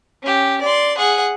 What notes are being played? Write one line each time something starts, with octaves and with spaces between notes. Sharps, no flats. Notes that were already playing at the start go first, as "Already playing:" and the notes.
C#4 G4
D5 C6
G#4 F#5